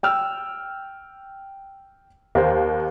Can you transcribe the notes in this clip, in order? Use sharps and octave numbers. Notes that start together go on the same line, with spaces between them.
G5 E6 F6
D#2 A#4 C5